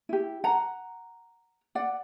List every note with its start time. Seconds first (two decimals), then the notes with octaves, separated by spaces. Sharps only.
0.09 E4 G4
0.44 F#5 A#5
1.75 D5 F#5